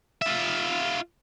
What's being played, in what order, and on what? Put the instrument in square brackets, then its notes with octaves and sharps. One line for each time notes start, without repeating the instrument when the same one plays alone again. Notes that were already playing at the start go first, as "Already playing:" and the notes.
[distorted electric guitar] F4 E5